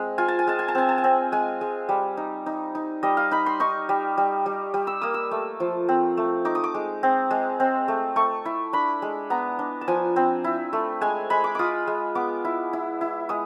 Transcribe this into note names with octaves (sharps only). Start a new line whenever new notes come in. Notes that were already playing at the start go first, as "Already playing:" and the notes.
Already playing: G#3 C4
F4 G#5
A5
G#5
G#3 A5
G#5
A5
C4 G#5
A5
G#5
C4
G#3 G#5
G#3
G3
D#4
D#4
D#4
G3 D#5
F5
D#4 B5
C6
D#4 C#6
G3
G3
G3
G3
E6
A#3 D#6
E6
A3
F3
C4
A3
D#4 D6
D#6
D6
G#3
C4
G#3
C4
A3
A3 C#6
E4
D4 B5
G#3
B3 A#5
D4
A5
F3 G#5
C4
E4
A3
G#3 G#5
G#3 B5
D6
F4 D6 D#6
G#3
B3 D6
E4
E4
E4
G#3 D#6